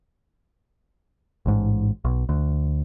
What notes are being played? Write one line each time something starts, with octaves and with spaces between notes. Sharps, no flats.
A1 G#2
B1
D2